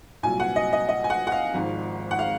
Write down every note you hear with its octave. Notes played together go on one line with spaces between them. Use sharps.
C2 A#2 F#3 G#5
F#5
D#5
D#5
D#5
G#5
F#5
F#5
F5
G#1 G#2 F3
F#5
F5